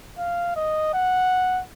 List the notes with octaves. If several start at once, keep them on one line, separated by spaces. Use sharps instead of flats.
F5
D#5
F#5